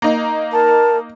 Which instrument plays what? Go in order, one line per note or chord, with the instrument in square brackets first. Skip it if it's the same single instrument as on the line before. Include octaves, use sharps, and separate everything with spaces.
[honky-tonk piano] A#3 D#4
[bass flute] A#4 [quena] A5